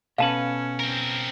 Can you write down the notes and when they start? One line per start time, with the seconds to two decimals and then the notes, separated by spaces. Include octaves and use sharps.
0.18 B2 C#4 A4 B4 F5 A5
0.80 C4 A#4